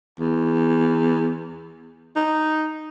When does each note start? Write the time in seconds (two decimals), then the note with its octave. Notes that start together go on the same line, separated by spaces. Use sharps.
0.19 E2
2.16 D#4